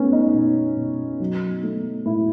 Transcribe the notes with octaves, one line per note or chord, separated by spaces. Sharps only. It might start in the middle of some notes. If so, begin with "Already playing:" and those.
Already playing: A3 B3 C#4
D#4
B2
B2
F#3
A3
A2 E4